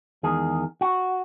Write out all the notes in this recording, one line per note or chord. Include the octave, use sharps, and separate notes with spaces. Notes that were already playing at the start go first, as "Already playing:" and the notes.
E2 D#3 G#3 G#4
F#4